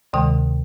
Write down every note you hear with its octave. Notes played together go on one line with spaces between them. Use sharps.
D2 C3 D#3 G#3 G5